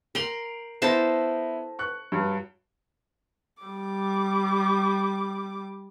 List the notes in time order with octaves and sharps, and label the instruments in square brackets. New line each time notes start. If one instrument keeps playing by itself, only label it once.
[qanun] A#4 C6 [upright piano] D7 F7 F#7
[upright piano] B3 E4 A#6 [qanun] A4 C5 A5
[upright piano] C#6 F#6
G2 F#3
[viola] G3 D6